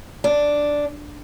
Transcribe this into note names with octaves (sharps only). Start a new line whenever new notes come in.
D4